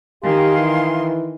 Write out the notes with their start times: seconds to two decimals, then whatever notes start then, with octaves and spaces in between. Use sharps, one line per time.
0.23 D#3 G4 F5 G#5 C6
0.58 E3